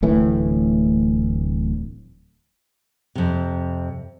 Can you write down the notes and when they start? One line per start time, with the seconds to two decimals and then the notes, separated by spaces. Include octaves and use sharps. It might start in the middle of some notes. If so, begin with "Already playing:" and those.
0.02 D1 A2 E3
3.15 F2 C3